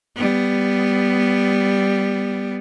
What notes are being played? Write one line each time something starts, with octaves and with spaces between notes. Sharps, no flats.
G3 B3